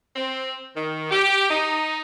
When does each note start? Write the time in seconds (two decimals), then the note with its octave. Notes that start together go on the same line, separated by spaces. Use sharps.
0.15 C4
0.76 D#3
1.11 G4
1.50 D#4